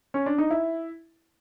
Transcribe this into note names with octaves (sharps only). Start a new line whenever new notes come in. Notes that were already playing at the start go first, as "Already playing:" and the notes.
C#4
D4
D#4
E4